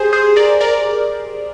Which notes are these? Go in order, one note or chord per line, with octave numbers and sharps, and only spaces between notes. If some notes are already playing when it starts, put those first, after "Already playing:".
Already playing: G4 G#4 C5
G#4 C5
A#4 D5
A#4 D5